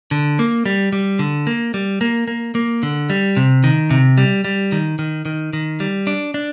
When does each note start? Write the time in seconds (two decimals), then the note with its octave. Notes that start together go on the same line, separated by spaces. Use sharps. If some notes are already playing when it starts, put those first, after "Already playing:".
0.11 D3
0.39 A#3
0.66 G3
0.93 G3
1.19 D3
1.47 A#3
1.74 G3
2.01 A#3
2.28 A#3
2.55 A#3
2.83 D3
3.10 G3
3.37 C3
3.64 D#3
3.90 C3
4.18 G3
4.44 G3
4.72 D#3
4.99 D#3
5.25 D#3
5.53 D#3
5.80 G3
6.07 D4
6.34 D4